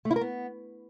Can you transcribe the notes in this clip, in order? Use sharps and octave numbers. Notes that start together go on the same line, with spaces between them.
A3
E4
A#4
B3